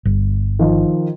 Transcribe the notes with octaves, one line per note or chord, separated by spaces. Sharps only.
G1
D#3 F3